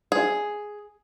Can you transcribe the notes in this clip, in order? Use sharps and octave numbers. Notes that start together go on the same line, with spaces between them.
G#4